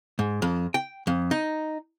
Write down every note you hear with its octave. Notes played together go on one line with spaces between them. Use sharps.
G#2
F2
G5
F2
D#4